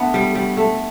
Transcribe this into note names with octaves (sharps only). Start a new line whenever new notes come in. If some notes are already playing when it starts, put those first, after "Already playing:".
Already playing: A3 B3 D4
G3
G3
A3